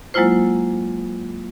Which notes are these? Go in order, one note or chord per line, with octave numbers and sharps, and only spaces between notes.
F#3 G#3 A#3 E4 F4 C5